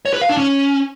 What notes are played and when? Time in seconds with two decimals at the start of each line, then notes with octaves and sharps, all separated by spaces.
0.05 C#5
0.13 B4
0.21 F5
0.29 D4
0.37 C#4